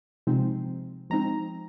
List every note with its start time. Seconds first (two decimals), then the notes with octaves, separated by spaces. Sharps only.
0.27 C3 F3 G#3 C4 D#4
1.10 F3 G#3 C4 D#4 A#5